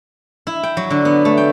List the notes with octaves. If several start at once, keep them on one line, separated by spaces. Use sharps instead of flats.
E4
G5
F#3
D3
B3
A3
G5